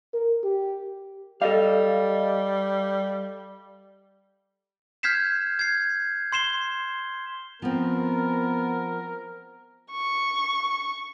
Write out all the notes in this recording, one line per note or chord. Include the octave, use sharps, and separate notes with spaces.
A#4
G4
G3 A4 D#5 F5
F6 G6 G#6 B6 C7 E7
G#6 C7
C6 C7 E7 G7
F3 B3 C4 A#4
C#6